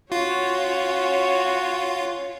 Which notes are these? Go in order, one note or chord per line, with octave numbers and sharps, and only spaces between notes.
C#4 F4 F#4 C#5